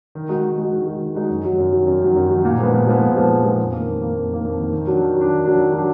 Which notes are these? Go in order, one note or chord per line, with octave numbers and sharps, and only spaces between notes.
D#3
G#3 D#4 F#4
D#3
G#3 D#4 F#4
D#3
G#3 D#4 F#4
D#3
G#3 D#4 F#4
F#2
D#3 F#3
F#2
D#3 F#3
F#2
D#3 F#3
F#2
D#3 F#3
A#2
F3 G#3 B3
A#2
F3 G#3 B3
A#2
F3 G#3 B3
A#2
F3 G#3 B3
F2
D#3 A#3
F2
D#3 A#3
F2
D#3 A#3
F2
D#3 A#3
D#3
F#3 D4
D#3
F#3
D4
D#3
F#3 D4
D#3
F#3 D4